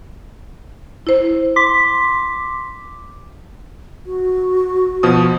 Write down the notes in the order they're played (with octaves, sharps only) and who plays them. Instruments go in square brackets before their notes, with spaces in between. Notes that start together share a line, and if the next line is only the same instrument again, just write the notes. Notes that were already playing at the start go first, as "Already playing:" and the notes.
[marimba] E4 C5
[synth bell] C6 D6 B6
[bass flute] F#4
[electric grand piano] B2 F3 D#6